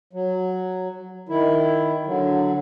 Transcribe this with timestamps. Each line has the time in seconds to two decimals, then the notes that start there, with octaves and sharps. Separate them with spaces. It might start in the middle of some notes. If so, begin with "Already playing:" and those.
0.13 F#3
1.29 D#3 E4
2.06 D3 F#3